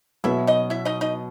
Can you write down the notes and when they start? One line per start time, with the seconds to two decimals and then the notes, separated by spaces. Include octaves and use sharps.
0.24 B2 F#3 B3 E4 E5
0.47 D#4 D#5
0.70 E4 E5
0.85 D#4 D#5
1.01 D#4 D#5